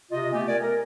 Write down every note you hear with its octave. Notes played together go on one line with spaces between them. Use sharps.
C3 F4 D#5
A3 B3 G4 G#5
A#4 D5 G#5
A#4